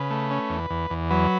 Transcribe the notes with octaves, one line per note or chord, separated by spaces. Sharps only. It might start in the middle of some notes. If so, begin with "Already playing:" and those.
Already playing: C#3 B4
A3
C#4
E2
E2
E2
F#3 B4